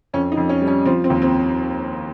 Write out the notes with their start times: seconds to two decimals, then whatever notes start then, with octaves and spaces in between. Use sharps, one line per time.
0.13 F2 C#4
0.32 D#4
0.37 F2
0.49 C#4
0.62 G3
0.67 C#4
0.85 F3 C4
1.04 C4
1.10 D#2
1.22 C4